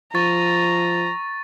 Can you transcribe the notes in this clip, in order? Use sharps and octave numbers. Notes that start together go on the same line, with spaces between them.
F3 A#5 C#6 A6